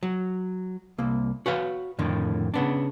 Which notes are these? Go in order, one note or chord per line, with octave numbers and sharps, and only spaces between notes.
F#3
C2 A#3
F#4 B4 C#5 F5
F2 A2 D3 D#3
C#3 B3 D4